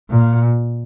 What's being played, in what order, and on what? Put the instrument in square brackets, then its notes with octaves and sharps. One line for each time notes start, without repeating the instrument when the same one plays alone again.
[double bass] A#2